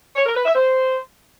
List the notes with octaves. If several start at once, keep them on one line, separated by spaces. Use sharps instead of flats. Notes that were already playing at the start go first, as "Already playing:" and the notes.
C#5
A#4
B4
E5
C5